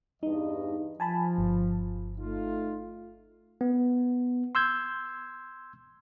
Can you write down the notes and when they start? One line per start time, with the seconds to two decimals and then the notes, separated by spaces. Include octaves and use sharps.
0.23 E2 G2 D#4 D#5
1.00 F3 G#5 A5 B5
1.38 G1
2.17 A3 D#4 F4
3.61 B3
4.55 C6 E6 G6 G#6